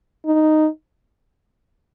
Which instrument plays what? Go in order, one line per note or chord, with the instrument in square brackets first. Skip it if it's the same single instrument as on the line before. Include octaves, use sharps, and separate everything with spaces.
[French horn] D#4